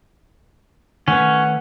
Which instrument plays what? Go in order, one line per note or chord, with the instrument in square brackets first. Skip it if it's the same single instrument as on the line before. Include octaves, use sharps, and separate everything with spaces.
[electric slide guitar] D#3 A3 B4 [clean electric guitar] C#4 [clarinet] F#5